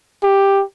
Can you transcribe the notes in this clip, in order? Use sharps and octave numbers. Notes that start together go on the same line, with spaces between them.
G4